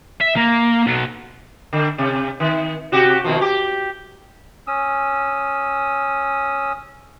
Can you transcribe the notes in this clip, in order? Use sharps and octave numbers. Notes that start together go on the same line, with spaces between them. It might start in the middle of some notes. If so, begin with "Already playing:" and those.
E5
A#3
B2 F#3
D3
C3
D#3
C3 F#4 G4
B2 D#3 F3
G4
C#4 D#6 E6